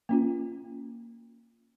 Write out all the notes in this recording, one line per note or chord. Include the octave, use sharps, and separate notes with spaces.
A#3 C#4 F4